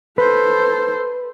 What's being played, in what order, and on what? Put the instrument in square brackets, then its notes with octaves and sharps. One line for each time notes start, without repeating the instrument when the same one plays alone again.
[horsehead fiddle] A4 C5 [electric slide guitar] B4